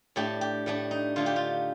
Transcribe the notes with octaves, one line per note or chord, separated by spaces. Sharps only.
A2 A3 D4 G4
G4
A2 A3 D4
D#4
D3 A3 D#4 F4
G4
F4